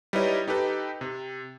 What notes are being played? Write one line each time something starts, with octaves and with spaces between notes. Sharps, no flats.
G3 D#4 E4 B4 C#5 D#5
D#4 G4 A4 B4
C3